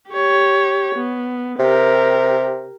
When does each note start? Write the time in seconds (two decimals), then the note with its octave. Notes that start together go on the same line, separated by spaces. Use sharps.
0.10 G4 C#5
0.95 B3
1.59 C3 G4 A#4